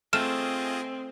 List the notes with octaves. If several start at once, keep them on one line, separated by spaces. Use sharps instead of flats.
A3 C4 F4 G#4 D#5 F6 E7